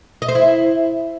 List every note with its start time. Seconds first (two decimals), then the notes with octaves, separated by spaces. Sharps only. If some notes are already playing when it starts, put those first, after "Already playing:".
0.22 D#5
0.29 C5
0.35 E4